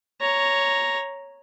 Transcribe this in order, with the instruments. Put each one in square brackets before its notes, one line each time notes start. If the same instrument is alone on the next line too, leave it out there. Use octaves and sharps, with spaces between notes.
[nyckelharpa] C#5 A#5